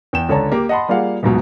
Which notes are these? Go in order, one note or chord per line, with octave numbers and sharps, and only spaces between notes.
E2 G5 E7
C#2 D3 D4 C#5 A5 A#5
A#3 G4
D#5 F#5 A5 B5 C6
G3 A#3 F4 G#4 F5 F#5
D#1 G#2 B2 F#3